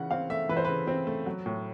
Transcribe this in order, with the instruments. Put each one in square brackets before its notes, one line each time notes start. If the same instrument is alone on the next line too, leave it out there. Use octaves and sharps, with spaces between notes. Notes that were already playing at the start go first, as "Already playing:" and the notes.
Already playing: [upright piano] C#3 E3 F#5
C4 F5
A3 E5
E3 B4
C5
C#3 B4
C4
A3
F#3
A2